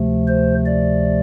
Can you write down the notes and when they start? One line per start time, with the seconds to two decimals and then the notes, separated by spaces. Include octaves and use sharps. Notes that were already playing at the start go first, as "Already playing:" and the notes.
Already playing: D2 C3 F3 A3
0.28 C5
0.66 D5